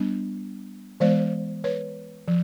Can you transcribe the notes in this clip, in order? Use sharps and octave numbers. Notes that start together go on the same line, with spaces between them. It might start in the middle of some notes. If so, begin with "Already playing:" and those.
Already playing: G3 B3 D4
E3 G#3 B3 C5 D5
B4 C#5
F3